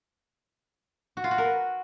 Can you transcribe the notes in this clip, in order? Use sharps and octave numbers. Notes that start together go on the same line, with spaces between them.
F#4
F4
F#4
A#4
B4